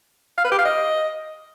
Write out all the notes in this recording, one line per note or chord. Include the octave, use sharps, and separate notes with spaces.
F5
B4
G4
F5
D#5